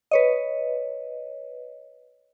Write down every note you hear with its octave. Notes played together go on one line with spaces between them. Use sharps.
B4 C#5 D#5